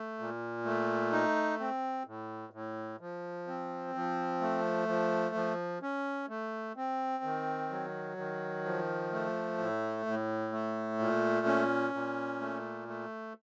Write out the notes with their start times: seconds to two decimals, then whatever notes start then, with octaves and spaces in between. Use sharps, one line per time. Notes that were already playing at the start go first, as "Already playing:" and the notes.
Already playing: A3
0.19 A#2
0.65 A3
1.12 D#4
1.60 C4
2.07 A2
2.53 A2
3.01 F3
3.47 C4
3.95 F3
4.41 A3
4.88 F3
5.35 F3
5.82 C#4
6.29 A3
6.76 C4
7.24 D#3
7.70 F#3
8.17 D#3
8.65 F3
9.12 A3
9.58 A2
10.06 A2
10.52 A3
10.99 A#2
11.47 C#4
11.94 A#2
12.41 A3
12.88 A3